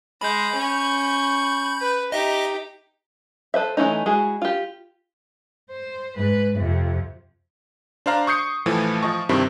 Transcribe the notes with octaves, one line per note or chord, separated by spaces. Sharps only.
G#3 B5 G6
C#4 C#6
B4
D#4 G4 D#5 E5
A4 B4 C5 E5
E3 F#3 A3 C#4 D#4
G#3 E4 F#4 G#4
F4 G4
C5
G#2 B4
F2 C3
D4 C5 F5 A#5
C#6 D#6 G6 C7 C#7
A2 E3 F3 A3 E4
F3 D#5 C#6
G2 C3 D#3 C4 E4